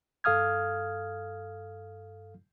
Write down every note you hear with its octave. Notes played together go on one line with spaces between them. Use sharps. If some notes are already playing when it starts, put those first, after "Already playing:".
G2 A4 F5 D#6 F6 G#6